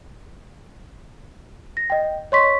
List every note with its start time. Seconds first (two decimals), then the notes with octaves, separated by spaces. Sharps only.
1.77 A#6
1.90 D#5 G5
2.32 C#5 D#5 C6 C#6 B6